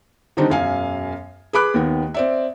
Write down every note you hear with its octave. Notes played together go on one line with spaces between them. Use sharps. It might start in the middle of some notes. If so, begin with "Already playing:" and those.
D3 D#3 G3 C4 D4 D#4
E1 F#2 F5 G#5
G#4 B4 B5 D6 F#6
D#2 D#3 B3
C4 D5 E5